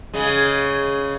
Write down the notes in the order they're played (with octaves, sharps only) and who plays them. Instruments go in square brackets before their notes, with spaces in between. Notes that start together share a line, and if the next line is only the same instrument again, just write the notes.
[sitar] C#3 G#3